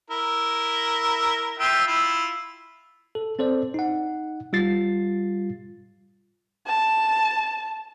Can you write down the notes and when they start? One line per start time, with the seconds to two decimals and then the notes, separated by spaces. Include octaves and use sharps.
0.10 E4 A#4
1.59 F4 E5 G5
1.88 E4 F4
3.15 A4
3.39 C4 A4 C5 D5
3.74 D#4 F#5
4.53 G3 F4 A6 C7
6.67 A5